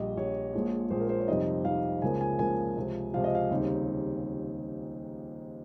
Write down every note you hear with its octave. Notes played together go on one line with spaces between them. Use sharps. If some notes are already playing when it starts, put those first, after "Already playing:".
Already playing: A#1 A#2 G3 D#5
A#1 A#2 G3 C#5
A#1 A#2 F3 G#3
A#1 A#2 F3 G#3 C5
A#4
C5
C#5
F2 C3 G3 C4 D#4 D#5
F2 C3 G3 C4 D#4 F5
C#2 C#3 F3 A#3 G#5
G#5
C#2 C#3 F3 A#3 G#5
C#2 C3 F3
C#2 C3 F3 F5
D#5
F5
D#2 C#3 G3 C4 D#4